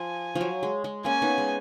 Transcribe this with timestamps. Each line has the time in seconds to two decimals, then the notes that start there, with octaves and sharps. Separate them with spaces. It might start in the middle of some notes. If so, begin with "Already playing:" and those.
Already playing: F3 G#5
0.35 F3
0.41 F#3
0.63 G#3
0.84 G#3
1.05 A#3 C#4 G#5
1.22 B3 D#4
1.38 G#3